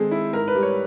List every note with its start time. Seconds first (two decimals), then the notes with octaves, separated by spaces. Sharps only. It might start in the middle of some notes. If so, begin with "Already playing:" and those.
Already playing: D#3 G#3 C4 G#4 A4
0.11 E4
0.33 G#2 A#4
0.48 B4
0.55 G3
0.63 C#5